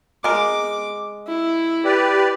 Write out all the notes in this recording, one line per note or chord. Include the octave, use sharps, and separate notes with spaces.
G#3 A#4 D6
E4
G4 B4 D5